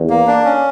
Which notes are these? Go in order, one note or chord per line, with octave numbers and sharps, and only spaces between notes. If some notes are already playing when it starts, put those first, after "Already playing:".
Already playing: E2
A#3
D4
C#4